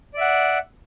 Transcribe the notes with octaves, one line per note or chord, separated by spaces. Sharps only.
D5 E5 F#5